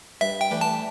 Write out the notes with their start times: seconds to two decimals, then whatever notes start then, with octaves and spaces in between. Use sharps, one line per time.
0.21 G2 E5
0.41 G5
0.51 E3 A3 D4 G4
0.61 A5